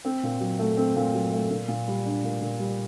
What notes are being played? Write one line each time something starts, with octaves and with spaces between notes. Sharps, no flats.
C4
A#2
F#3
A3
C4
A#2
F#3
A3
A#2
A#2
G3
D4
A#2
A#2
G3